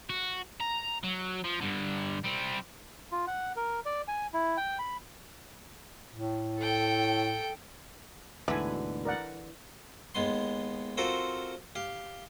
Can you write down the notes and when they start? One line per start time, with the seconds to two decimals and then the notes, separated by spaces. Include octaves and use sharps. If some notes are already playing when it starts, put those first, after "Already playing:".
0.10 F#4
0.61 A#5
1.03 F#3
1.44 F3
1.61 G2 D3
2.25 G3 C4
3.12 F4
3.27 F#5
3.56 A#4
3.85 D5
4.08 G#5
4.33 E4
4.57 G5
4.79 B5
6.12 A2
6.58 A4 G5
8.48 D2 G#2 B2 D3 E3 B4 E5 G#5
9.05 A#4 D5 F#5
10.15 D#2 G#3 B3 C6
10.97 C4 F4 F#4 A4 A#4 C5
11.75 G4 F5